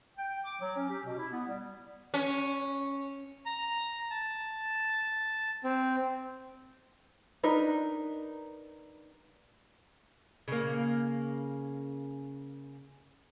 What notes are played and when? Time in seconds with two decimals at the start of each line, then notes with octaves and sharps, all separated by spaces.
0.17 G5
0.45 D6
0.61 F#3
0.76 C#4
0.89 G4
1.04 B2
1.18 E4
1.32 B3
1.48 G3
2.14 C#4
3.46 A#5
4.10 A5
5.64 C4
7.43 D4 D#4 A#4 B4
10.48 C#3 A#3